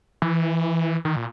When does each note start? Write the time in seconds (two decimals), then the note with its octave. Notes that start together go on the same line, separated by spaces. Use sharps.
0.22 E3
1.05 D#3
1.16 A#2